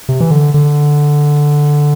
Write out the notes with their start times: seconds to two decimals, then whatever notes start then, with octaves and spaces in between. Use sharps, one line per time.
0.09 C3
0.20 E3
0.31 D3
0.54 D3